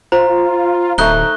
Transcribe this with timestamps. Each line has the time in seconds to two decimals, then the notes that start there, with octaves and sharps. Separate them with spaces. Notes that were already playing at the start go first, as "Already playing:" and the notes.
0.12 F4 C5 A#5
0.98 D1 A3 D#4 F#6 G7